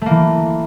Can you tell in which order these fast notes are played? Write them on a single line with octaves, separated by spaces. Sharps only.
A3 A#3 E3